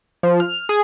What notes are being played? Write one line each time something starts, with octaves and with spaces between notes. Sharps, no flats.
F3
F6
G#4